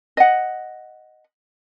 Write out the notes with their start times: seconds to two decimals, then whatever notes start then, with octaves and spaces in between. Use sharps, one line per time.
0.17 D#5 F#5